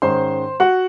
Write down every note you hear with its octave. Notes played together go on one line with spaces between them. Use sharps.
G#2 D#3 G#3 C#4 C5 C6
F#4 F#5